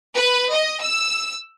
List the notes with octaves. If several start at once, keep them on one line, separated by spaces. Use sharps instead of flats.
B4
D#5
E6